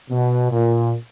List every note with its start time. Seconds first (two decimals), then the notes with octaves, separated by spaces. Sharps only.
0.10 B2
0.51 A#2